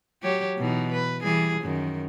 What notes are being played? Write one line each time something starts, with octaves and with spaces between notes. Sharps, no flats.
F#3 G4 C#5
B2 E3 D#4
B4
E3 G3 G#4
F#2 D#3